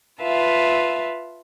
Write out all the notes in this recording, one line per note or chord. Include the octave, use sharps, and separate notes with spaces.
F4 B4 E5 F5 A5